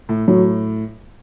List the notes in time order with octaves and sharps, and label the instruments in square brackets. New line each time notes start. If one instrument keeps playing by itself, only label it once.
[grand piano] A2
[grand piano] A2 [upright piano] F#3